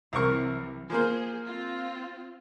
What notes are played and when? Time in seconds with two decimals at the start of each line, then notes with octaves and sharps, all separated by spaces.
0.13 C2 C3 E3 F#3 A#4 C#6
0.90 F3 A#3 G#4 C5
1.45 C4 F4